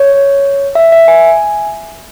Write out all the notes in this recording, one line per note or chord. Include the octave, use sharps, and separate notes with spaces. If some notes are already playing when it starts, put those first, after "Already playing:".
Already playing: C#5
E5
E5
G#5